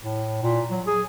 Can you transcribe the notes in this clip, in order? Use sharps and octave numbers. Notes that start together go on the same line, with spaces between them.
A2
A#2
F#3
G#4